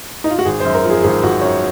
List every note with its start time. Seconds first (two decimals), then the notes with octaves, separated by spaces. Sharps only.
0.24 D#4
0.30 F4
0.39 F#4
0.45 G#1 G#4
0.60 F#2 C5
0.74 A#4
0.85 F3 G#4
1.03 G#1 G#4
1.23 G#1 F#4
1.42 F#2 C#5